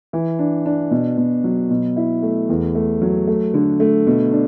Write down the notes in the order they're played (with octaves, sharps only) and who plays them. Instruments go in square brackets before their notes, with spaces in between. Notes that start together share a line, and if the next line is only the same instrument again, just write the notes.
[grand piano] E3
D4
D4
B2
B2
F#3
B2
E4
A3
E2
A3
F#3
A3
D3
A3
B2
D4